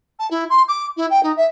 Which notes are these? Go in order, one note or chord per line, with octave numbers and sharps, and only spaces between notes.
A5
E4
C6
D6
E4
G5
D#4
E5